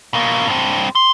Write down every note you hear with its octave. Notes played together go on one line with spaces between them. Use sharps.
B2 A#3
G2 C4
C6